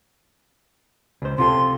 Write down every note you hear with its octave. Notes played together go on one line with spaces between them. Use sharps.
C#2 C5
C3 F4 A4 C6